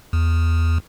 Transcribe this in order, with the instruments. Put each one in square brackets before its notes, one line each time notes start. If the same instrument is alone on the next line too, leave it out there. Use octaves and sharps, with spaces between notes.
[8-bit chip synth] E2